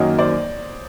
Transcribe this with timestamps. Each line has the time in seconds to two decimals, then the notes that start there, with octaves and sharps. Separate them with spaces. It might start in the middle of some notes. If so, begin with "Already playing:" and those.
Already playing: F#2 D#3 F#3 A#3 C#5 D#5
0.19 C5 D5